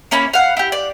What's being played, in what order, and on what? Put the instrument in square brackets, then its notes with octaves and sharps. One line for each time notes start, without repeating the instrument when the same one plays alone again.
[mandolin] A#3 C#4 E4 B5
F5 F#5
E4 G4
D5